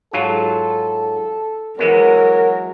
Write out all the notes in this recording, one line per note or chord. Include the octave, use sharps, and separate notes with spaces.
G#2 F#3 F4 A4
E3 F#3 G#3 B3 A#4